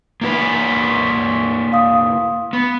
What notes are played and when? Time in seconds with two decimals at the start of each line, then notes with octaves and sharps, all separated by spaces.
0.21 A#3 E4 B4
1.73 F5 D#6
2.53 B3